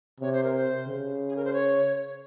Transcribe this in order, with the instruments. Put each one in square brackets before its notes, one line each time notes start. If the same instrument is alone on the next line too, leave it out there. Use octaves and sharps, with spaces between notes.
[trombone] C3 [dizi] C#5
[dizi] C5
A#4
C5
[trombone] C#3
[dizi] G#4
A#4
C5
C#5